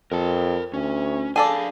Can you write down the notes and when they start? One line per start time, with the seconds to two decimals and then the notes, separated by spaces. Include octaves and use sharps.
0.12 F2 A#4 A5
0.74 D2 C#4
1.36 D4 G#4 A4 D5 F5